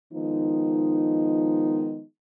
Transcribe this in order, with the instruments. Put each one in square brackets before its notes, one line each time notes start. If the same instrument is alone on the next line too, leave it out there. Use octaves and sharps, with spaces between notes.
[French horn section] D#3 F3 G#3 B3 D#4